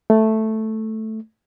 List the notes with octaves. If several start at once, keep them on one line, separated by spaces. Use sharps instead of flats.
A3